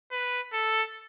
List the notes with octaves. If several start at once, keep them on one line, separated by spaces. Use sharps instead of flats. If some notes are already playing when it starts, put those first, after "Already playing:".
B4
A4